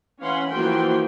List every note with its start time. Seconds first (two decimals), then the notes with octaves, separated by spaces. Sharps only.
0.21 E3 C#4 F5 F#5 B5 C6
0.50 E3 F3 A#3 F#4 G5 C6